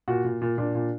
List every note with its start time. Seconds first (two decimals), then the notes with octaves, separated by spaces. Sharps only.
0.08 A#2 F#4
0.24 A#2
0.42 A#2
0.58 A#2 D4
0.75 A#2